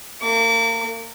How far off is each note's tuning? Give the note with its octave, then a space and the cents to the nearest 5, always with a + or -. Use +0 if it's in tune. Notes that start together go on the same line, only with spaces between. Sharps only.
A#3 -35 D6 -35